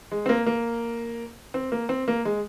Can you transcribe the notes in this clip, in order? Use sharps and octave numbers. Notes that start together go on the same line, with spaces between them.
G#3
C4
A#3
A#3
C4
A#3
C4
A#3
G#3